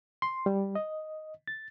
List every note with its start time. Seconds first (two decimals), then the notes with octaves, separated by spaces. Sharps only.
0.22 C6
0.46 G3
0.75 D#5
1.47 A6